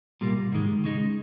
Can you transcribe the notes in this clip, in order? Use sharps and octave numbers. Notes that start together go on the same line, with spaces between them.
C2 A#2 G3 A#3
G#2 D#3 G#3
C#3 G#3 D#4